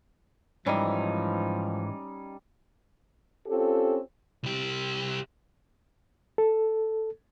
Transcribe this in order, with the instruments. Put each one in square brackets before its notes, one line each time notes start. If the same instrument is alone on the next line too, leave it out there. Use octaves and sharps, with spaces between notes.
[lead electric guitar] G#2 E3 [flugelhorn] F3 [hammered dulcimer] G3 [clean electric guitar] C#4 D#4
[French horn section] C4 C#4 F4 G4 A4
[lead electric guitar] C2 G4
[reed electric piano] A4